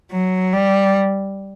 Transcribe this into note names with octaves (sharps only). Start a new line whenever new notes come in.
F#3
G3